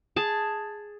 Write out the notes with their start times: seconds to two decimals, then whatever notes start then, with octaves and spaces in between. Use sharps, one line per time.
0.16 G#4 A5